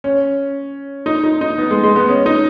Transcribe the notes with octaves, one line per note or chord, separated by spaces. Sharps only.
C#4
D#4
D#4
D#4
B3
G#3
G#3
B3
C#4
D#4